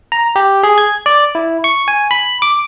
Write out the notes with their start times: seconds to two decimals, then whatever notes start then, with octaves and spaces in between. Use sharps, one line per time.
0.12 A#5
0.36 G4
0.63 G#4
0.78 G#6
1.06 D5
1.35 E4
1.64 C#6
1.88 G#5
2.11 B5
2.42 D6